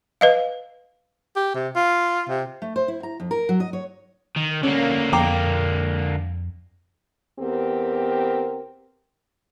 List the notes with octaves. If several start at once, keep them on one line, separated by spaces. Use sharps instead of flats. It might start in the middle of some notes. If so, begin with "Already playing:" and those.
B4 D#5 F5
G4
C3
F4
C3
A3
C5
E4
A#5
F2
A#4
F#3
D#5
C#5
D#3
D3 A#3 C#4
F2 G5 A#5 D6
E2 B3 C4 G4 A#4